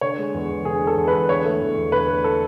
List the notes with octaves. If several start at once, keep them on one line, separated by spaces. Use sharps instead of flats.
D3 C#5
G#3
E2
E2
D3 G#4
G#3
A4
E2
B4
E2
D3 C#5
A3
E2
E2
D3 B4
A3
A4